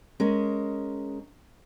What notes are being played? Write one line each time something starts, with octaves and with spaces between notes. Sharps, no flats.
G#3 C#4 A#4